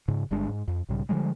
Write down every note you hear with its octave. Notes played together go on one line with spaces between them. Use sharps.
G#2 C#3
G1 G2 G#3 D4
G#2
F2
B1 G#2 C#3 G3
D3 F3 G3 G#3